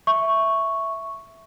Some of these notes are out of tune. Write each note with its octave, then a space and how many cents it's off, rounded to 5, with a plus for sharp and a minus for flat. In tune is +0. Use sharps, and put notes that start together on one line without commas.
E5 +0 C#6 +0